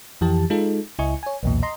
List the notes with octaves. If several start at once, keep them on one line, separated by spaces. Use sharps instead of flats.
F2 E3 G4 A5
G#3 D#4 F4 A4
C#2 E4 D#5 G#5 C#6
C#5 G#5
B1 E2 A#2
D#5 A#5 C6